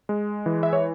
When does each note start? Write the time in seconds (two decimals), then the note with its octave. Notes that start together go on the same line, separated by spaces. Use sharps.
0.09 G#3
0.46 E3
0.63 E5
0.73 C#5